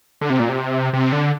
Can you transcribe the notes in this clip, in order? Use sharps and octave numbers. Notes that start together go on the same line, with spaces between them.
D3
C3
A#2
C3
C3
D3